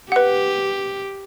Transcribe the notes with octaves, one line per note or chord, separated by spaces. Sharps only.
G4 B4 F#5